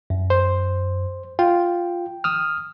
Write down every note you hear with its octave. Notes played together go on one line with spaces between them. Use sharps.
F#2
C5
F4 G5
D#6 F6